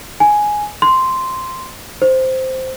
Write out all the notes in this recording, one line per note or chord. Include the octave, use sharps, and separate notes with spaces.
G#5
C6
C5